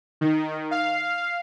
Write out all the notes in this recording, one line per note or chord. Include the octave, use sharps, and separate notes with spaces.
D#3
F5